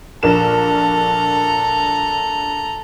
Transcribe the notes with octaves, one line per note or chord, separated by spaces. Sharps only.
A#1 A4 A#4 A#5 E7